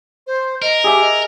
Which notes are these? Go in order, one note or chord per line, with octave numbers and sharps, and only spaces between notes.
C5
A#4 D#5
G4 G#4 E5
D#5